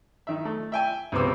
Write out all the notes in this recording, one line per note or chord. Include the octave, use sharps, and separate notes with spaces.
D#3 E5
A3
E5 G5 G#5
C#2 C3 B3 C5 D6 E6